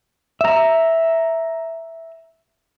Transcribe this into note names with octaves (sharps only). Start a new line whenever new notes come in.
E5 A#5